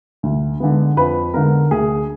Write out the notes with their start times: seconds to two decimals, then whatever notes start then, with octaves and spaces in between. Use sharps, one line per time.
0.23 D2
0.60 D3 G#3 B3
0.97 F2 B4
1.34 D3 G#3 B3 A#4
1.71 D2 G#4